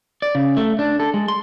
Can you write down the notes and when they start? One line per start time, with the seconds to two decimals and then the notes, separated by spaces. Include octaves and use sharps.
0.22 D5
0.35 C#3
0.57 A3
0.79 D4
1.00 A4
1.14 G#3
1.28 C6